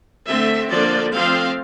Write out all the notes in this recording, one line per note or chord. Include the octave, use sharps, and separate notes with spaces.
D3 A3 C4 E5
D3 F3 A#3 D4 D5
F3 A3 C4 F5